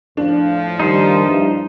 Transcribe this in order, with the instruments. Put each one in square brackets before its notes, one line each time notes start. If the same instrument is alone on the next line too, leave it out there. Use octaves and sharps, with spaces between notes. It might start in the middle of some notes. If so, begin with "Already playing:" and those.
[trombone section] F2 A2 F3 [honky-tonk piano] D4
[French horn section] D#3 G3 [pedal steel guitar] D#4 C5
[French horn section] G2 E4 [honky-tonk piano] D4